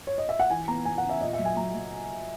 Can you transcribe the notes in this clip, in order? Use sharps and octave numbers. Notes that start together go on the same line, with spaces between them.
C#5
D#5
E5
F#5
E3 G#5
B3 A#5
B3 G#5
F#5
C#3
E5
A#2 D#5
E5
F#3
G#5
F#3 A#5
F#3